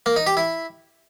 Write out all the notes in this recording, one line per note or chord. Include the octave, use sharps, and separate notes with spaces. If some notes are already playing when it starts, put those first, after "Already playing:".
A#3
D#4
G4
E4